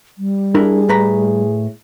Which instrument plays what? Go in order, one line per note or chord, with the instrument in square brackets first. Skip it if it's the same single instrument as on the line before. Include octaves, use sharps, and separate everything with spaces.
[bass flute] G3
[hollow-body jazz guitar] D4 E4 A#4 [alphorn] G#4
[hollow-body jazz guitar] A2 B4 A#5